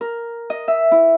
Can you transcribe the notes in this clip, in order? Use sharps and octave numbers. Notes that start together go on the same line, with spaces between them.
A#4
D#5
E5
E4